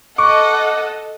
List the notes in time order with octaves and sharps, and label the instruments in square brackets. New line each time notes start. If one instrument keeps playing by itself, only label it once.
[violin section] A4 D#5 [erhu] F#5 [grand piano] C#6 [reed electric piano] D6